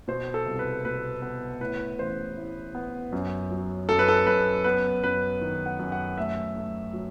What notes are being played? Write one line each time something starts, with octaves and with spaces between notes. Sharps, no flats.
B2 C5
A4
C2
B4
B2 B4
B3 B4
A2 B4
A1 C5
A2
B3
F#2
F#3
F#2 A4
B4
A4
F#2 B4
B3 B4
F#2 B4
D#3
F#5
F#2
F#5
A3 E5
A3
F#3